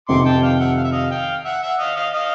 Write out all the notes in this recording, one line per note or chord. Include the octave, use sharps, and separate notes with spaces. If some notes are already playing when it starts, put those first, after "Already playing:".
F1 F2 C3 D#3 C6 D6
G5 A5
F5 G5
E5 F#5
F5
E5
D#5 F5
F5 G5
E5 F#5
E5 F#5
D#5 F5
D#5 F5
D#5 F5